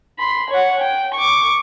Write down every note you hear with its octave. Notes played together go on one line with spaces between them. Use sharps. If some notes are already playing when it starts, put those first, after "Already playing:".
B5 C6
C#5 F#5
G5
C#6 D6